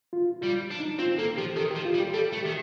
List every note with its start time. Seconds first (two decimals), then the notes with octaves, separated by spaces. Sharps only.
0.13 F4
0.41 G3 F4
0.70 D4
0.80 D#4
0.99 C4 F4
1.18 A#3 A4
1.37 F3 G4
1.56 D#3 A4
1.71 G4
1.76 F3
1.85 F4
1.95 G3
2.00 G4
2.14 G3 A4
2.33 A3
2.43 D#3 G4